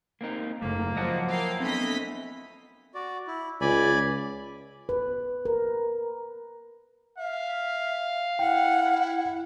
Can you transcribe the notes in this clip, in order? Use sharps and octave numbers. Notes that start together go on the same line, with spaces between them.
A#3 C4 D#4
F#1 G#2 A3 A#3
F3 F#3 D#5 F#5 A5
A#3 E4 F5 G5
A3 B3 C4 D4 D#5 B6
F#4 D5
E4
C#2 D5 G#5 B5
B4
A#4
E5 F5
E4 F#5 G5